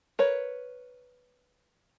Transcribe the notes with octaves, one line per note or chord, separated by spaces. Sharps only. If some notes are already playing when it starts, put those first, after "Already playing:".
A#4 B4 C#5